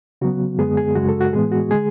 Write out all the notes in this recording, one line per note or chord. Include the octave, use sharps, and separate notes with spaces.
C#3 F#3 B3 F#4
F#2 D3 G#3 B3 G#4
G#4
F#2 C#3 G#3 F#4
A4
F#4
A2 E3 G#3 B3 G#4
F#4
D3 G#3 G#4